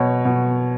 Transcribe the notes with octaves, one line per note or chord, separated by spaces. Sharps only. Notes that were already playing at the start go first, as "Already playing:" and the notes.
Already playing: B2 C#5
B2